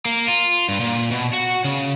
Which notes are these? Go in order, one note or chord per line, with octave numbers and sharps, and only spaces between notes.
A#3
F4
G2
A#2
B2
F#4
C#3